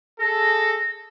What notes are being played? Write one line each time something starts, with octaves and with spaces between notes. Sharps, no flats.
G#4 A4 A#6